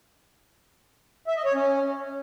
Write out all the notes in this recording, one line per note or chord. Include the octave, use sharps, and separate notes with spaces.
E5
D#5
C#5
C#4